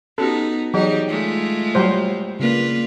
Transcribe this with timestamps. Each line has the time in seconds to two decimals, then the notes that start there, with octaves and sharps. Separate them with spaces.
0.18 B3 C#4 D#4 F#4 G4 A4
0.74 E3 F#3 G3 D#4 G4 G#4 D#5
1.08 G#3 A3 F4
1.75 F#3 G3 C5
2.39 C#3 A#3 D4 F4 B4